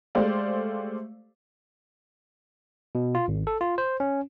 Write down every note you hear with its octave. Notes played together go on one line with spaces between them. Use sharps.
G#3 A3 G4 C5 D5 F5
B2
F4
G#1
A4
F4
C5
C#4